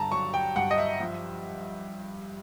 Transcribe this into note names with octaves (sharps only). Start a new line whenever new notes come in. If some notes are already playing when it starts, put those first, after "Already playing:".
Already playing: G2 D3 A5 A#5
F#3 C#6
G5
G2 F#5
D#5
E5
F3